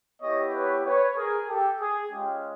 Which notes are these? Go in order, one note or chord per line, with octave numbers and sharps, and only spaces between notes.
B3 E4 G4 C#5 D#5
B4 C#5
B4 C#5
G#4 A#4
G4 A4
G#4
G#3 C#4 F4 G4